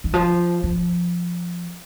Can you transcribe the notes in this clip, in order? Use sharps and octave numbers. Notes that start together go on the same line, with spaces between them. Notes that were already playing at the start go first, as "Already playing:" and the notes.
D#3
F3
F3